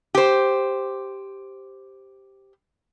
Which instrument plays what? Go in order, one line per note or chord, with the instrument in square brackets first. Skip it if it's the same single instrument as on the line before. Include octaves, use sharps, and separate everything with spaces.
[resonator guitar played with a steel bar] G4 C5